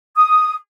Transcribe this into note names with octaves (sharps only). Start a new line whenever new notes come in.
D#6